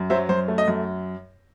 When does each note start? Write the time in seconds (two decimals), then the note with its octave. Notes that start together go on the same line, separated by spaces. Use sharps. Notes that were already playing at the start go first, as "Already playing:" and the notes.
Already playing: F#2
0.10 F#3 C5 E5
0.29 F#2 C5
0.48 A3
0.58 D#5
0.68 F#2